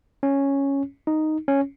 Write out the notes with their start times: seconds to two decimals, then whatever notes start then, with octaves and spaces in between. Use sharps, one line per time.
0.23 C#4
1.07 D#4
1.48 C#4